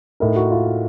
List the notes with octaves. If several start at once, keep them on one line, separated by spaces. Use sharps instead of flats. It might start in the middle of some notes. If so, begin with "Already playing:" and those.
A2 A3 D#4 A#4
F#4
F4